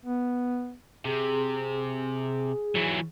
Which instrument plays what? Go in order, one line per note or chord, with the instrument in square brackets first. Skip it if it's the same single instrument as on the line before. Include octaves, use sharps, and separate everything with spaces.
[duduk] B3
[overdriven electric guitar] C3 [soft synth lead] G#4
[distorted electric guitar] E3 F#3